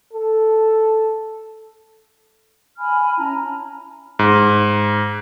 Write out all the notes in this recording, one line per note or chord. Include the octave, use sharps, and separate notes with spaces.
A4
G#5 B5 F6
C#4 E4 A5 A#5
G#2